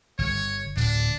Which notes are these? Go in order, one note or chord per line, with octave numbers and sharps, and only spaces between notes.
G1 C#5
D1 D4